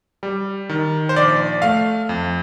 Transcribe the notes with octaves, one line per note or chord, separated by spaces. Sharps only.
G3
D#3
C5
A#1 D5
A3 F5
F2